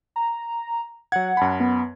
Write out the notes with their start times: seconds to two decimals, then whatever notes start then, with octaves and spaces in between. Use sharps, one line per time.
0.16 A#5
1.12 F#3 F#5 G#6
1.37 F#2 A5 B5
1.60 B3